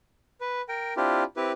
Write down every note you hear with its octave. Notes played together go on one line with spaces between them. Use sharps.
B4
A#4 G5
C4 D4 E4 F4 G4
C4 E4 G4 B4